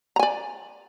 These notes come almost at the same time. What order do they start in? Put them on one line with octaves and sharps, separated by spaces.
A#5 G#5 D5